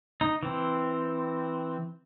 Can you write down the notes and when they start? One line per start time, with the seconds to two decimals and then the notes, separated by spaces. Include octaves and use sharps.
0.21 D#4
0.43 E3 C4